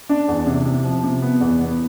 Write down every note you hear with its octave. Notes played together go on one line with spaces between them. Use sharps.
D4
E2
C3
C3
F3
C3
B3
E2
B3